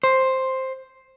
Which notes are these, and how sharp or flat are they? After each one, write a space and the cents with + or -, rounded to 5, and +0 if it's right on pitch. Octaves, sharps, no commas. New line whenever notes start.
C5 +5